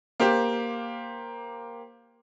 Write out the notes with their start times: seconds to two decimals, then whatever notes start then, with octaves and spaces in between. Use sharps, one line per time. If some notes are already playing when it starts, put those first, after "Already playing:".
0.20 A#3 G4 C5